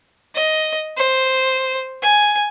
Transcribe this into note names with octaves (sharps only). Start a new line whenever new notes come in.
D#5
C5
G#5